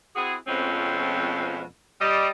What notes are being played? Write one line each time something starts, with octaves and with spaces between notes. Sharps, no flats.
C4 E4 F#4 G#4
F2 B2 F3 G#3 C4 C#4
G3 D#5